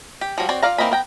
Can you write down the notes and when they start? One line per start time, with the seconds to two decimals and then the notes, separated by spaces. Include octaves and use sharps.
0.21 G4
0.38 F3 G3 F#4 C#5
0.49 C4 F#4 C#5 D5
0.63 F4 C5 D5 F5 A#5
0.78 E3 A#3 C4 D#5 B5
0.91 B3 G5 A#5